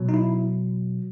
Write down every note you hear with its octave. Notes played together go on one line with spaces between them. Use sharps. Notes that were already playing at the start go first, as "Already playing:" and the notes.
Already playing: B2 F#3
D#4
E4